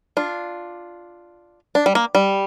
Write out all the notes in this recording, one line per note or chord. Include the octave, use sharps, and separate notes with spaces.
D4 F4
D4
G3
A#3
G3